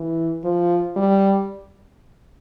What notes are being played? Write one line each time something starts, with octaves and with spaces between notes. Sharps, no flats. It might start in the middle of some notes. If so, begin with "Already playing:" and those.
Already playing: E3
F3
G3